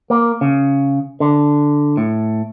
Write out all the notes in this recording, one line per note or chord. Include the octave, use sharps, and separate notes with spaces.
A#3
C#3
D3
A2